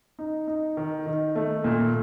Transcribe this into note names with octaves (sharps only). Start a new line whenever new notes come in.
D#4
D#4
D#3
D#3
A3
A#2